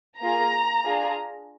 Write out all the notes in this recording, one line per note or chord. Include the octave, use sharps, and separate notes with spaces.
A#3 F4 G#4 A#5
D4 F4 G#4